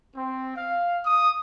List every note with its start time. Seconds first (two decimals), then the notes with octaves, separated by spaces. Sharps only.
0.16 C4
0.56 F5
1.05 D#6